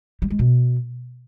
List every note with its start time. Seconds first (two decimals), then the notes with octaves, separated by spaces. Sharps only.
0.22 G3
0.30 G#3
0.39 B2